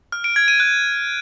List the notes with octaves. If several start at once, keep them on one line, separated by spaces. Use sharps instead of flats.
F6
D7
G#6
D#7
F#6